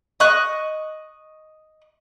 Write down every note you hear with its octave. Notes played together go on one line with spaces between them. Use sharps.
D#5 C#6 F#6